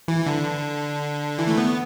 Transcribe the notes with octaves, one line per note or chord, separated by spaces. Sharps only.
E3
D3
E3
A3
B3